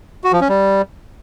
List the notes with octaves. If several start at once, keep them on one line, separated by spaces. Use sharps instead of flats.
F#4
F3
C#4
G3